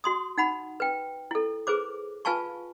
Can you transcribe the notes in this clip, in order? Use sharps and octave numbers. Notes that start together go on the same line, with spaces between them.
F#4 C6 D#6
D#4 F#5 B5
B4 G5
E4 A4
G#4 B4 C5 D6
F4 B4 F5 G#5 A5 C#6